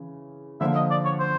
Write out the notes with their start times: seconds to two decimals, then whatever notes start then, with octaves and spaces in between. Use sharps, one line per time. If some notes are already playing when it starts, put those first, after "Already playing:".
Already playing: C#3 E3 C#4
0.61 D3 F3 A#3 E5
0.75 D#5
0.91 D5
1.05 C#5
1.20 C5